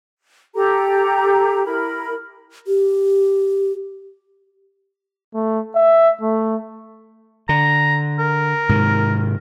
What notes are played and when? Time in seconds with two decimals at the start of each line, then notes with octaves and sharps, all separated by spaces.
0.55 G4 A4 A#5
1.65 E4 A#4 B5
2.67 G4
5.34 A3
5.75 E5
6.21 A3
7.49 D3 A#5
8.19 A#4
8.69 G#2 C3 D#3